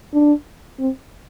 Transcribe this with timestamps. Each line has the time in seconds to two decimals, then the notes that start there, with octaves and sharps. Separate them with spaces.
0.14 D4
0.79 C4